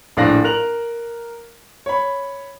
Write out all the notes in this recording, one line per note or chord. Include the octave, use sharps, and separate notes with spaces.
A#1 A2 D4 F5 F#6 A#6
A#4 F#6 F7 F#7
C#5 B5